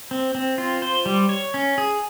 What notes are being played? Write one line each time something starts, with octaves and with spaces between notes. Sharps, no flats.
C4
C4
F4
C5
G3
C#5
C#4
G#4